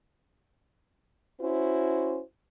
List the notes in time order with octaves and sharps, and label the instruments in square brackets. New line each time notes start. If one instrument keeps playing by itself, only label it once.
[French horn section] C#4 E4 F#4 C5